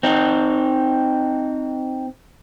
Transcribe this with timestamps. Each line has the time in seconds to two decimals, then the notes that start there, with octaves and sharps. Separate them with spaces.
0.03 C4 D#4